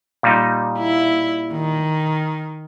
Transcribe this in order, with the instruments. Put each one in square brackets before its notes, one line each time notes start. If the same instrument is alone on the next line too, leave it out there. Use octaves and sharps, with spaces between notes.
[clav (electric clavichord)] A#2 G3 D#4
[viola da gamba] E4
D#3